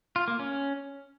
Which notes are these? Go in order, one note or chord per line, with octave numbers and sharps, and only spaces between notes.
F4
A#3
C#4